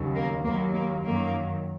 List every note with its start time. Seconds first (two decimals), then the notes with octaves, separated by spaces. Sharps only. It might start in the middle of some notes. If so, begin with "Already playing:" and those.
Already playing: D#2 C#3 F#3
0.15 A#3
0.44 D#2 D#3 F#3 A#3
0.74 A#3
1.03 F#2 D#3 F#3 A#3